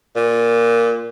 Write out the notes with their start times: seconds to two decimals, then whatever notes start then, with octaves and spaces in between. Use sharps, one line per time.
0.16 A#2